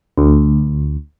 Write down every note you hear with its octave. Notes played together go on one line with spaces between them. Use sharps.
D2